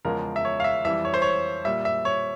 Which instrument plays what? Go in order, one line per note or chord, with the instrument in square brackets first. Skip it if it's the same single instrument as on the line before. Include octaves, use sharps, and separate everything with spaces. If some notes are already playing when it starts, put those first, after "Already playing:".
[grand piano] E2 C#3 F3 G#3 A#4
E5
C#5
F5
E5
F2 E3 G3 E5
C#5
C5
C#5
A#2 G3 E5
E5
C#5